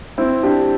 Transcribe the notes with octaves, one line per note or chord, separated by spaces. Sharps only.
C4 E4
D4 G4